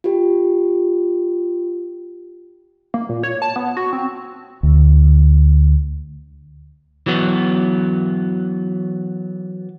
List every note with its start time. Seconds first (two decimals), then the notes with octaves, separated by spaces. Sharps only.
0.04 F4 G4
2.94 A#3
3.09 A#2
3.23 C#5
3.42 A5
3.56 B3
3.77 F#4
3.93 C4
4.63 D2
7.06 E3 F#3 B3